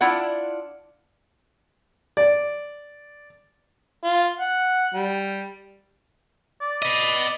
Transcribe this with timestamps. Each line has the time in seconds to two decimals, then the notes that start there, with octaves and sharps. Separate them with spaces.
0.01 D4 E4 F4 F#5
2.17 D5
4.03 F4
4.40 F#5
4.94 G3
6.61 D5
6.82 B4 D#5